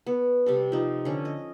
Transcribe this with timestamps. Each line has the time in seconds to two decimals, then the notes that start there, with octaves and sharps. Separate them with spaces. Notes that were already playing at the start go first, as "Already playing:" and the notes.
0.06 B3
0.46 C3 G3 A4
0.72 F3 D#4
1.05 D3 C#4
1.25 D#5